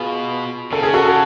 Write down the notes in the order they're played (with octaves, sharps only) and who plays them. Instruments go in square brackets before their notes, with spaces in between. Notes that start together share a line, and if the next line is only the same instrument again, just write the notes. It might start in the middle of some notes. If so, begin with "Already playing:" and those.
Already playing: [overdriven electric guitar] B2 [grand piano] F4 G#4
[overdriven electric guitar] C#3 [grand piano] A4
[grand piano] G#4
F#4 A4